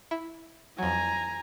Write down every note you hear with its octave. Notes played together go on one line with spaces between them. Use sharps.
E4
F2 F#3 G#5 A#5